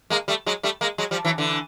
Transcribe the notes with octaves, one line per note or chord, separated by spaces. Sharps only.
G#3 A#3
G3 A3
F#3 G#3
G3 A3
G#3 A#3
F#3 G#3
F3 G3
E3 F#3
D3 E3